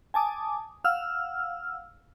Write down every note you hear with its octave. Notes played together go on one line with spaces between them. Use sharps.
G#5 A5 D6 D#6
F5 F#5 E6 F6